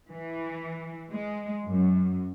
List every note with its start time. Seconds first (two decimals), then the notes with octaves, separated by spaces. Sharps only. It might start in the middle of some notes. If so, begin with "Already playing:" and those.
0.12 E3
1.13 G#3
1.66 F#2